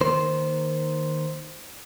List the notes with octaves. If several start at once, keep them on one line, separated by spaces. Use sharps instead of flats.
D#3 A#3 C5